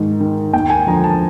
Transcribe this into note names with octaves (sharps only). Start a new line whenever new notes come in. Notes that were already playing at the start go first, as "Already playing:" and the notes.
Already playing: G#2 D#3
D#3
D#2 G5
G#5
D3 F3 A#5
A5